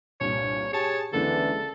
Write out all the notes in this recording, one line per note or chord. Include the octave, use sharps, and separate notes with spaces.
C2 G2 A#2 C#5
G4 G#4 C#5 A5
C#2 D3 E3 A#3 A4